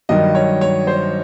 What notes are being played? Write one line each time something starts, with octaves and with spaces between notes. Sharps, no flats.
G2 D#3 F#3 D#5
C#5
C#5
C5